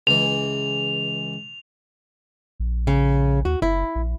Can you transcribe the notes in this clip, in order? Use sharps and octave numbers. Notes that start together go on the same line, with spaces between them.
C#2 E3 F7
A#1
C#3
D#2 F#4
F#1 E4
A#1